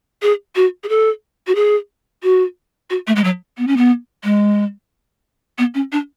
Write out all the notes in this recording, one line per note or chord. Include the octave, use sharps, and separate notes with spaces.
G#4
F#4
G#4
A4
F#4
G#4
F#4
F#4
A3
G#3
F#3
B3
C#4
B3
G#3
B3
C#4
D4